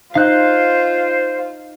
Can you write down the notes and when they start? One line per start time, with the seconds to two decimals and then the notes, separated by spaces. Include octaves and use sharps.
0.15 D#4 F4 C5 F5 F#6 G6